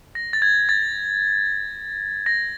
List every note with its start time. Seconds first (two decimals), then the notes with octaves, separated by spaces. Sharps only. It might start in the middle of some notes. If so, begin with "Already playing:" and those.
0.15 A#6
0.33 A6
0.42 G#6
0.69 A6
2.26 A#6